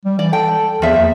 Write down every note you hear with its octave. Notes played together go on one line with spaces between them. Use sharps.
G3
E3 D5
A4 G5
E2 F3 E5
A#3